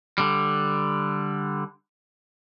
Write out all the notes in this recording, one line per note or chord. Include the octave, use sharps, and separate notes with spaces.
D3 G3